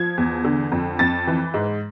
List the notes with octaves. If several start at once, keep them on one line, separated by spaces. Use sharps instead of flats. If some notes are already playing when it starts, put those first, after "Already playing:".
Already playing: F3 G#6
E2
D3
F2
F2 A6
E3
G#2